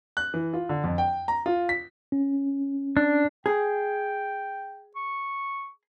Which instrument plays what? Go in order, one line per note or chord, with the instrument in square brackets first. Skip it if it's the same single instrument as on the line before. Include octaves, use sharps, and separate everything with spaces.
[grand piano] F#6
E3
F4
D3
F2
G5
A#5
F4
B6
[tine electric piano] C#4
[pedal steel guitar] D4
[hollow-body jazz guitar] G#4 [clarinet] G5
[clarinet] C#6